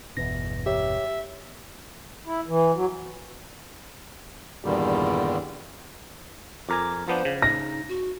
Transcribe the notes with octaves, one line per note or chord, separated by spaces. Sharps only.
G1 E2 B2 A#6
G4 C#5 E5
E4
E3
F#3
E2 G2 A#2 D3 D#3 G3
F2 A#4 G#5 D6
F3 B3 D4 C5
C#3
D#4 A#6
F#4